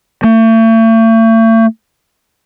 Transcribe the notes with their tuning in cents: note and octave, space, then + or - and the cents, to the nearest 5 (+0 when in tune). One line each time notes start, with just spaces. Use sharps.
A3 +40